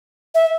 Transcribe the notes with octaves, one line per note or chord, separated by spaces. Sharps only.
E5